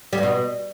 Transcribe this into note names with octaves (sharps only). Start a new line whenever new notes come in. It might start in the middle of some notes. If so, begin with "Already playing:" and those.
G3
G2
B2